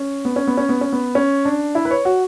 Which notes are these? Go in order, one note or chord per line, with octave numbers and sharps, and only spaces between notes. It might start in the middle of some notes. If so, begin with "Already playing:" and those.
Already playing: C#4
B3
C#4
B3
C#4
B3
C#4
B3
C#4
D4
E4
B4
C#5
F#4